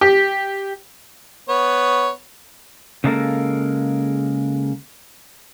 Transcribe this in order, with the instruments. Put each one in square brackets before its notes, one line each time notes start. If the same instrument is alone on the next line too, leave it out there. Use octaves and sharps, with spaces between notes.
[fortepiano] G4
[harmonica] B3 C#5
[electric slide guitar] C#3 F#3 G#3 A#3 A4 A#4